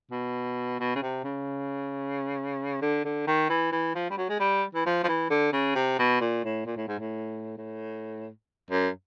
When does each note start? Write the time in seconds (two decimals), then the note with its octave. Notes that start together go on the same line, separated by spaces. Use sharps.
0.11 B2
0.79 B2
0.96 C#3
1.02 C3
1.24 C#3
2.82 D3
3.05 D3
3.27 D#3
3.49 E3
3.72 E3
3.95 F3
4.10 G3
4.18 F#3
4.29 G#3
4.40 G3
4.75 E3
4.86 F3
5.03 F3
5.08 E3
5.30 D3
5.53 C#3
5.75 C3
5.99 B2
6.20 A#2
6.44 A2
6.66 A#2
6.77 A2
6.88 G#2
6.99 A2
7.57 A2
8.70 F#2